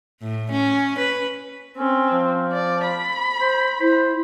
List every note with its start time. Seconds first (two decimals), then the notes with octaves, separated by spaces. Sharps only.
0.21 A2
0.52 C#4
0.99 B4
1.77 C4 C#4
2.12 F3
2.52 D5
2.86 B5
3.40 C5
3.80 E4 C5